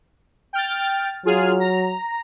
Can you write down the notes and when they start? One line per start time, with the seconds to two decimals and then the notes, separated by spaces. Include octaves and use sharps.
0.53 G5 F6 A6
1.25 F#3 F4 G#4 F6
1.60 A#5